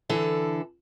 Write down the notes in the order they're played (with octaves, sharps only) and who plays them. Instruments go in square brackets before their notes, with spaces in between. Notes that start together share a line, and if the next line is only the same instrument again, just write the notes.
[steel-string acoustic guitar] D3 E3 A4